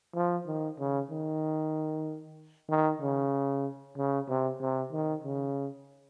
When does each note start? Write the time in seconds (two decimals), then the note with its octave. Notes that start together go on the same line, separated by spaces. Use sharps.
0.15 F3
0.46 D#3
0.79 C#3
1.11 D#3
2.69 D#3
3.01 C#3
3.97 C#3
4.28 C3
4.61 C3
4.92 D#3
5.24 C#3